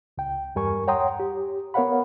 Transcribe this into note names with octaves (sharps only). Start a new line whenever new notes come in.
C#2 G5
E2 G2 G3 A#4 G#5 C#6
C#5 F#5 G5 A#5 C6 D#6
G4
B3 A#4 C#5 F5 F#5 B5